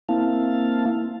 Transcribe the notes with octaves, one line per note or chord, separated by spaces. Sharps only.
A#3 C4 E4 F5 A5